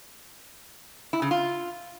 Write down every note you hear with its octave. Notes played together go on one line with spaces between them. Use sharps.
E4
C#3
F4